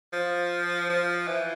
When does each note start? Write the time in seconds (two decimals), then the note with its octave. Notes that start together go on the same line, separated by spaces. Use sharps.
0.13 F3
0.89 F3
1.27 E3